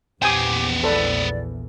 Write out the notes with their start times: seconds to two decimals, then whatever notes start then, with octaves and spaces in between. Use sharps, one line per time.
0.22 A#1 E2 B3 G4 C5 G5 G#5 D#6
0.84 A4 B4 D5